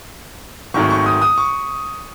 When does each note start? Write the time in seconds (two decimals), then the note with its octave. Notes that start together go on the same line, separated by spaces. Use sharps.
0.74 G#1 G#2 D#3 F#3 A3 C#6
0.90 C#6
1.06 D#6
1.22 D#6
1.38 C#6